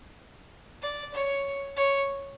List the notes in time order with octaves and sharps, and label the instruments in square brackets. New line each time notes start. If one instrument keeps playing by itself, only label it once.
[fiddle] D5
C#5
C#5